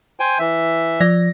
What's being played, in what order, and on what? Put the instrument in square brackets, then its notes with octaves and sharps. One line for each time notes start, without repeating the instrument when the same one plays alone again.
[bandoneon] C5 G5 G#5
E3 E5
[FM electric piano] F3 D5 A#6